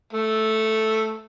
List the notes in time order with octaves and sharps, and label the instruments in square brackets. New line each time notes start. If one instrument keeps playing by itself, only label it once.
[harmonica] A3